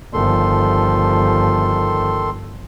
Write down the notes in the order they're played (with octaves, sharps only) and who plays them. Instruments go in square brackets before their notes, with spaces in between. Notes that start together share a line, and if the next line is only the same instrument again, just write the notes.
[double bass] G1 F3 [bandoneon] D#3 A4 C6